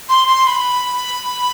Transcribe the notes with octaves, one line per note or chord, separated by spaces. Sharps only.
C6
C6
B5